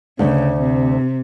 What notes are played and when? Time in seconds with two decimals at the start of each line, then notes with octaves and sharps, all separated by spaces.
0.19 D2 C#3 A3
0.60 C3